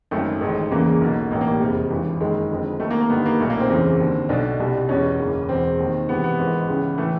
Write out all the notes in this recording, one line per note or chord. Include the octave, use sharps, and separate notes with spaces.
G#1 F#2 D#3 A3
A1 G#2 D#3
E1 E2 C#3 E3 A#3
B1 B2
A1 A2 E3 A#3
A#3
G3
F1 E2 C3
G#1 G2 E3
F#1 F#2 D#3 G#3
F1 F2 D3
D#2 D#3 A3
A#3
A#3
G1 G2 D#3 B3
A#3
B1 A#2 A3
A#3
C4
F#1 E2 C#3 E3
D#2 D3
B1 B2 D4
C2 B2
E1 E2 B2 C#4
F#1 E2 C#3 E3
E1 E2 B2 C4
D#2 D#3
C#2 C3 E3 B3
B3
G#1 G#2 E3
C#2 C#3 E3
A2 E3 A3